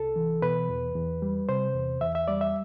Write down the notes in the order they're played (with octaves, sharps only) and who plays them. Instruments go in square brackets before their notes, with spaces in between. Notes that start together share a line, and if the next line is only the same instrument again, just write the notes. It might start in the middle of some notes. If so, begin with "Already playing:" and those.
Already playing: [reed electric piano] C2 A4
E3
B2 B4
E2
E2
G3
C3 C5
E2
E2 E5
E5
G3 D5
E5